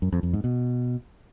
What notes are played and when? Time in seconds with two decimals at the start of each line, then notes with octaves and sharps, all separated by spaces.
0.02 F#2
0.12 F2
0.23 F2
0.33 G#2
0.44 B2